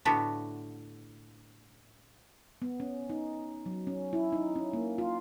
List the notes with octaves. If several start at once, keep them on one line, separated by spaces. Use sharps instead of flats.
A2 D3 A3 B3 F#4 G4
B3
C#4
D#4
F#3
C#4
E4
D#4
C#4
A#3
F4